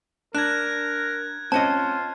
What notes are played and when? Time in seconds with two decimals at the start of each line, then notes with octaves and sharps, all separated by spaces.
0.35 D4 A#4 F#6 G#6
1.52 C4 C#4 F4 D#5 A5